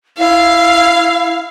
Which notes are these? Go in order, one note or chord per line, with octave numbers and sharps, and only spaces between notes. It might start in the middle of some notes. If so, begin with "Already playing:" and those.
E4 F5